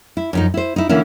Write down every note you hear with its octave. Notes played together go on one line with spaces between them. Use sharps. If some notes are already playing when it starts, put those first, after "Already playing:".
E4
F#2 F3 D#4
E4 C5
D#4 E4
D3 E3 A#3 C#4 E4